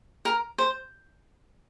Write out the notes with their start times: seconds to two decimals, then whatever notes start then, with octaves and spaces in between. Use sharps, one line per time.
0.25 A#4
0.58 C5